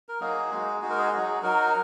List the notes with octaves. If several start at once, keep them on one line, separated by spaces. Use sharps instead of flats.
A#4
F#3 A#3 D#4 F#4 G#4
G#3 D#4 F#4
G#3 D#4 F#4 G#4
A#4
G#4
F#3 D#4 F#4
F#3 D#4 F#4 A#4